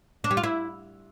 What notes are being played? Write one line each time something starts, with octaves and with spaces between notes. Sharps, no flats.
D4
G3
F4
E4